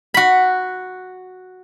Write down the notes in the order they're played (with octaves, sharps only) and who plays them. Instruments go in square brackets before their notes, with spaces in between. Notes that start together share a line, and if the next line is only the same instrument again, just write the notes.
[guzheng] F#4 B5